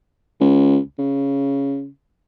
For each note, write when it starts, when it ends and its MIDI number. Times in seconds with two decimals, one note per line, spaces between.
0.41 0.78 37
0.98 1.87 49